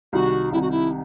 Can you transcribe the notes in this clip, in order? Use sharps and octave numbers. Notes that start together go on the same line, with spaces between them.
C2 C3 D#3 F#4
C2 C3 D#3 E4
F#4
E4